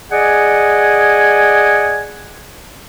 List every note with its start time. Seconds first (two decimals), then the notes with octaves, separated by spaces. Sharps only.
0.12 G#4 D5 D#5 F#5 G#5